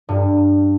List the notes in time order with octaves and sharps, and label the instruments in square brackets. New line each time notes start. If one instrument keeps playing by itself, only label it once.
[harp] G2